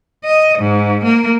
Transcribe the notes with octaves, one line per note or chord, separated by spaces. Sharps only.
D#5
G#2
A#3